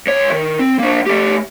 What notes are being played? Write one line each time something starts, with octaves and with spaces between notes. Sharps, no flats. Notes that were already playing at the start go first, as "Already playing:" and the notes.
C#2 C#5
D#3
C4
A#3 D4
A3 G4